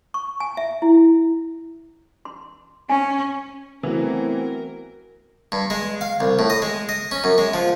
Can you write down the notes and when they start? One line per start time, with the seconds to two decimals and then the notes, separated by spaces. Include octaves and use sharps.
0.14 C#6
0.40 G#5
0.57 E5
0.82 E4
2.25 C6
2.90 C#4 G#5
3.83 E3 F#3 A3 B3 C4 A#4
5.52 G2
5.70 G#3
6.01 F5
6.20 C2
6.39 A2
6.50 D#5
6.62 G#3
6.89 D#5
7.11 C#4
7.24 F#2
7.38 G#3
7.54 F3